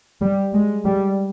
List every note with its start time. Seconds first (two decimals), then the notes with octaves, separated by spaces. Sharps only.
0.22 G3
0.54 G#3
0.84 G3